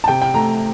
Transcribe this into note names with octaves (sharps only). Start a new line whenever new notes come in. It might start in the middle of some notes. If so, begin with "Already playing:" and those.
A5
C3 G5
G5
A3 A#5